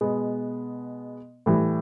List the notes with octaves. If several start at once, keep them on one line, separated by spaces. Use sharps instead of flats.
B2 G#3 B3
A2 E3 G3